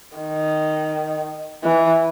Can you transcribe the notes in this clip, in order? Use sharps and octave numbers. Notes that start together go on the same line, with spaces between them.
D#3
E3